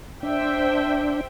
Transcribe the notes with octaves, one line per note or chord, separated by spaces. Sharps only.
D4 C5 E5 G5